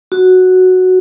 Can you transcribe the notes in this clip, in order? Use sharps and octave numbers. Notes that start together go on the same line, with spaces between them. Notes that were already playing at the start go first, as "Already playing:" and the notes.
F#4